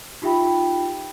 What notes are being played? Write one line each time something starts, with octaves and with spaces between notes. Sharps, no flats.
D#4 F4 G4 E5 G5 B5